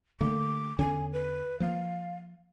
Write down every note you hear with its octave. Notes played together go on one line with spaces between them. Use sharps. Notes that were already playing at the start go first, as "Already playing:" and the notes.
D3 A3 A#3 D6
E2 D3 C#4 G#5
B4
F3 A#3 F5